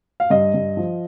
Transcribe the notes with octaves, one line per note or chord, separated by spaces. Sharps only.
F5
G2 D#5
G2
F3